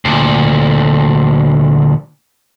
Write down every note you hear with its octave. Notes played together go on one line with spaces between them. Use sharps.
D2 A#2